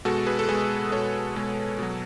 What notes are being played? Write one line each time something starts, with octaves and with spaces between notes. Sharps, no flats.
B2 G#3 F#4 A4
G#4 B4
A4
B2 G#3 G#4 B4
B2 G#3 A4 C#5
B2 G#3
B2 F#3